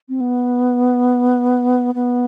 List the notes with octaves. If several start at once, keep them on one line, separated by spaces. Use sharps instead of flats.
C4
B3
B3